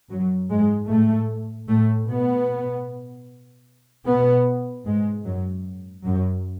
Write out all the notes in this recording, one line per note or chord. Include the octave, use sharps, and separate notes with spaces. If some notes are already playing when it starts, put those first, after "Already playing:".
F#2 F#3
G#2 G#3
A2 A3
A2 A3
B2 B3
B2 B3
G#2 G#3
F#2 F#3
F#2 F#3